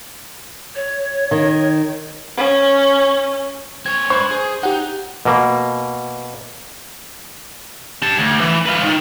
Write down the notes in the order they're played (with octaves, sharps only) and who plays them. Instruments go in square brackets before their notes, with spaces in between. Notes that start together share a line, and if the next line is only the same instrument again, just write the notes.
[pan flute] C#5
[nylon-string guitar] D#3
[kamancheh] C#4
[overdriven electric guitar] C4 C#5 [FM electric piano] G#6
[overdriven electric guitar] D4 B4 [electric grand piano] C5 [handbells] C#6
[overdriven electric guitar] G#4
[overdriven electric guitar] D#4 [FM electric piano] G4 F#5
[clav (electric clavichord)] B2 A#3
[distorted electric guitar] G4 A5
D2
E3
F4 B4
D#3